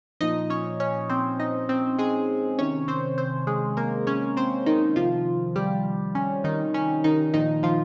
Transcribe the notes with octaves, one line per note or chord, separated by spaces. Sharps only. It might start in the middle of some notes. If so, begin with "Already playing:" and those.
A#2 F3 D#4 D#5
C#4 C#5
C#4 C#5
C4 C5
D#4 D#5
C4 C5
G#3 G#4
C3 D#3 C#4 C#5
C4 C5
C4 C5
G#3 G#4
A#3 A#4
C#4 C#5
C4 C5
D#3 D#4
C3 D#3 F3 F4
G3 G4
C#4
D#3 D#4
C#4
D#3 D#4
A#2 D#3 F3 D#4
F3 F4